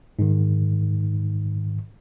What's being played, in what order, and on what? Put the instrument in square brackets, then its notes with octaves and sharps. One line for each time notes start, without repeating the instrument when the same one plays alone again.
[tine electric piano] G#2 D#3